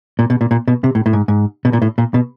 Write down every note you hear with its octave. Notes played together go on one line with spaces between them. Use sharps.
A#2
B2
A#2
A#2
B2
C3
A2
A2
G#2
G#2
B2
A#2
A2
A#2
B2